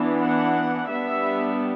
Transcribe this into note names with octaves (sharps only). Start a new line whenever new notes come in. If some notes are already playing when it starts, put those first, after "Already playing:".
Already playing: E3 B3 D4
F#5
G3 B3 D4 E5